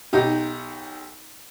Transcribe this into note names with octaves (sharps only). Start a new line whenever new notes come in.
B1 D#4 G4